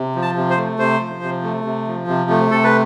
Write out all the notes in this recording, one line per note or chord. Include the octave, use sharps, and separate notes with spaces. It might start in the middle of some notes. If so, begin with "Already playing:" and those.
Already playing: C3
F3
A5
C3
C5
A3
C3 C5
F3
C3
A3
C3
F3
C3
A3
C3 A4
B4